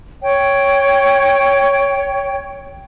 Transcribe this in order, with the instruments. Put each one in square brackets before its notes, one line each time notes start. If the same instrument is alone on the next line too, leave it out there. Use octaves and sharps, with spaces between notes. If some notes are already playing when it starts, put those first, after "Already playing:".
[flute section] C#5 G5